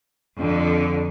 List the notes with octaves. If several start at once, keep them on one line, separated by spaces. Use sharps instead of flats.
F2 D3